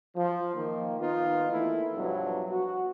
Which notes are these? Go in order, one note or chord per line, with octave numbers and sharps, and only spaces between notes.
F3
D#3 A#3
D#3 B3 D#4 F4
E3 A3 A#3 E4
G2 B2 F3 F#3
F#4